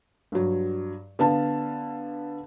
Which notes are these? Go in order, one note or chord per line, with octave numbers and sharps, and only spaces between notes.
G2 F#3
D3 B3 F5 A5